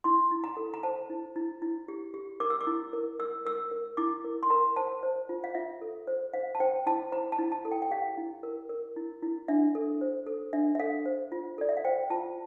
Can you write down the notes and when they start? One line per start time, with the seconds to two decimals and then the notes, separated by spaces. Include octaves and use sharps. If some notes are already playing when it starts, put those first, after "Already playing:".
0.04 E4 C6
0.31 E4
0.44 A#5
0.57 A4
0.74 A#5
0.83 C5 A5
1.10 E4
1.36 E4
1.62 E4
1.88 G4
2.14 G4
2.40 A#4 D6
2.50 E6
2.61 D6
2.67 E4
2.93 A#4
3.19 A#4 E6
3.45 A#4 E6
3.71 A#4
3.97 E4 D6
4.25 A#4
4.43 C6
4.50 A#4 A#5
4.76 C5 A5
5.03 C5
5.29 F4
5.44 F5
5.55 F4 E5
5.81 A4
6.07 C5
6.34 C5 F5
6.55 A5
6.60 C5 G5
6.86 E4 A5
7.12 C5 A#5
7.32 A5
7.39 E4
7.52 A5
7.65 A4
7.72 G5
7.82 G5
7.91 G4 F5
8.17 E4
8.43 A#4
8.69 A#4
8.96 E4
9.23 E4
9.48 D4 E5
9.75 A4
10.01 C5
10.27 A4
10.53 D4 E5
10.75 E5
10.79 A4 F5
11.06 C5
11.32 F4
11.58 A4 D5
11.69 E5
11.77 F5
11.85 C5 G5
12.10 F4 A5